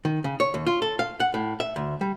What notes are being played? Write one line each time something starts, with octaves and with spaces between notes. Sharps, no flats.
D#3
C#3
C#5
D#2
F4
A4
F5
F#5
A2
E5
D2
G3